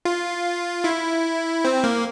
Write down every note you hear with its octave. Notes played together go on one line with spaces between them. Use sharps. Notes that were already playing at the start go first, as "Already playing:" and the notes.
F4
E4
C4
A#3